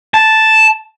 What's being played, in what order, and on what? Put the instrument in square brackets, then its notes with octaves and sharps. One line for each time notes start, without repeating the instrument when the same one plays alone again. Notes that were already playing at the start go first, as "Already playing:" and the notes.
[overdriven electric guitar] A5